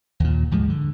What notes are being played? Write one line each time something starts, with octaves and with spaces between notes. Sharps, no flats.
D#2 A#2
D2 G#2 F3 G#3
D3